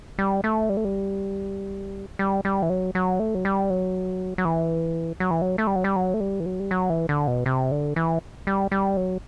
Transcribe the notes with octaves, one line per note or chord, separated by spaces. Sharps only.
G3
A3
G3
A3
G3
G3
G3
E3
F#3
F#3
A3
F#3
G3
F#3
F#3
E3
F#3
E3
F#3
A3
G3
F#3
G3
F#3
A3
G3
E3
F#3
G3
F#3
E3
D3
B2
C3
D3
E3
G3
G3
F#3